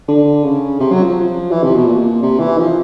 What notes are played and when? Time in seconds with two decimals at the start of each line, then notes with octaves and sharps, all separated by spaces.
0.08 D3
0.44 C#3
0.80 C3
0.92 F#3
1.03 F3
1.51 E3
1.63 C3
1.75 B2
1.86 A#2
2.22 C3
2.39 E3
2.58 F3